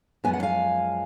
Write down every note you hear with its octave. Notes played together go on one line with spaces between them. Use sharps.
F#2 F3 G#3 B3 G#5
F#5
F5 G#5